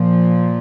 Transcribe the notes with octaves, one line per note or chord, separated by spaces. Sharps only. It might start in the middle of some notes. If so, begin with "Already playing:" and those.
Already playing: A#2 F3